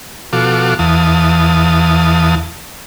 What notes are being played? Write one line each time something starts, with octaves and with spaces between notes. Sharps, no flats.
B2 F3 F#4 A4 F5 D6
E2 E3 F5 A5 D#6